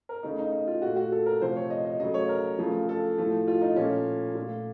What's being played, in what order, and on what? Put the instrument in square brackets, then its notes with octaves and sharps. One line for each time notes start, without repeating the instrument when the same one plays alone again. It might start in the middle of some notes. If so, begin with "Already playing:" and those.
[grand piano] A#4
C#3 A3 D#4
D#4
D#4
F4
A#2 A3 F#4
F#4
A4
A#4
C3 F3 A3 C5
C#5
D#5
D#5
C#3 F#3 A3 D#5
C#5
A#4
C#3 F3 A3
A4
A2 F3 A3
F4
D#4
A#2 F3 A3 C#4
A#2 A3